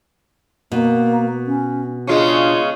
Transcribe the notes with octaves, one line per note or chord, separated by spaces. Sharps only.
B2 A#3
C#4
C#3 G#3 C#4 D4 F4